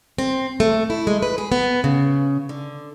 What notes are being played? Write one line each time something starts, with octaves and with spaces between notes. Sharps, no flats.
C4
A3
E4
G#3
B4
G#4
B3
C#3
D3